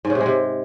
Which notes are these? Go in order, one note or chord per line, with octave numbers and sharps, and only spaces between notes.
G#2
C#3
C3
G#3
C3